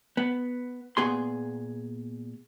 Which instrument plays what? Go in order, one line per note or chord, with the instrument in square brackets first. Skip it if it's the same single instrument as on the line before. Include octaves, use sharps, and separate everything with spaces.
[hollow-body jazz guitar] B3
A#2 B3 G#4 C6